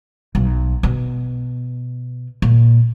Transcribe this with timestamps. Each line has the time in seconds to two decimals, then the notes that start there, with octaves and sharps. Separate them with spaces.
0.35 B1
0.83 B2
2.42 A#2